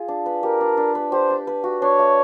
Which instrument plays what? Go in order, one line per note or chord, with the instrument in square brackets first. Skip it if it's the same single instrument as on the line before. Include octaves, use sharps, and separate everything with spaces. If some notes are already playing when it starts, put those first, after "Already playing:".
Already playing: [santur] F4 G#4
D4
B4
[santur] G4 [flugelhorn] A#4
[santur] D4
D4
B4
[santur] G4 [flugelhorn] C5
[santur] D4
B4
F#4
[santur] D4 [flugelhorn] C#5
[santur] A3